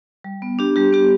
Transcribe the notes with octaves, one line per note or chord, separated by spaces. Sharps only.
G3
B3
D4 G4
G3 G4
B3 G4